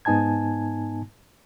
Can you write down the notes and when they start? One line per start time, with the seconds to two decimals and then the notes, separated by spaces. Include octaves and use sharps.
0.05 G#2 B3 D#4 G#5 A5 G#6